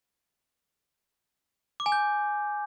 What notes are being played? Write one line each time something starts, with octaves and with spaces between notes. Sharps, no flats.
D6
G#5
G6